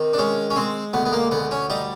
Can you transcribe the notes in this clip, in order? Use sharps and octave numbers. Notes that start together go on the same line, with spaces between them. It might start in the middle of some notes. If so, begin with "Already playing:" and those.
Already playing: C3 D#3
D4
G#3 C#4
C#4
G#3 C4
D2 B3
B3
A#3
D2 B3
C#4
G3 D#4